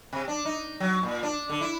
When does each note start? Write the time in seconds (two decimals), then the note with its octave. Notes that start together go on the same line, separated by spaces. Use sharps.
0.13 C3
0.28 D4
0.45 D#4
0.80 F#3
1.03 A#2
1.23 D4
1.50 D3
1.61 E4